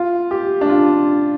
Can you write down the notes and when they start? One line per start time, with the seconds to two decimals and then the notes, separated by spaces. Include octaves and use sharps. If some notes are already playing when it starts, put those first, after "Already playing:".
Already playing: F4
0.31 G4
0.61 D4
0.69 F4